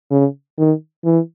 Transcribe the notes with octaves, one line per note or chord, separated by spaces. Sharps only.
C#3
D#3
E3